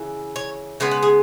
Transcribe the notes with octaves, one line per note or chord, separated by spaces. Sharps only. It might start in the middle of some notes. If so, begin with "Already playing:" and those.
Already playing: C#3 E3
C#5
C#3 G#3 B3 C#5
B4
G#4